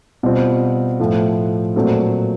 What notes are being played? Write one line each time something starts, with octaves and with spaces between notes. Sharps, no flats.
B2 G3 C4 F4
A2 F3 A3
A#2 F#3 A3 C4